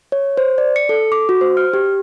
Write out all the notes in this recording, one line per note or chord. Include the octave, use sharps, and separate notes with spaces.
C#5
C5
D5
C#7
A4
D6
F#4
C5
F6
G4